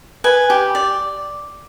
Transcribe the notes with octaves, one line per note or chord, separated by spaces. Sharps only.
B4 G#5
G4
D5